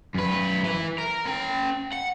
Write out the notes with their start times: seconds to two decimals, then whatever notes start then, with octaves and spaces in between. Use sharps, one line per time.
0.14 F#2 B4
0.64 E4 B4
0.98 A#4
1.25 C#4 G5
1.93 F#5